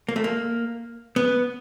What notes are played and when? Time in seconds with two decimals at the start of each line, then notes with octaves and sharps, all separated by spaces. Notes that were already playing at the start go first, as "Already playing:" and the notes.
0.08 A#3
0.16 A3
0.24 A#3
1.16 B3